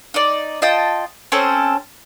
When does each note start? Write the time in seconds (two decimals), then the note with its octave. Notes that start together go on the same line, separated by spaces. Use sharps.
0.14 D#4 D5
0.62 F4 D#5 G5 A5
1.32 C4 C#4 A4 C5